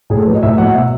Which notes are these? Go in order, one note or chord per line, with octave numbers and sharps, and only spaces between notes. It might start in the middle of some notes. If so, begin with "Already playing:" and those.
A2 G#4
A4
F#3 B4
D#5
A2 E5
F#3 F#5
B2 E5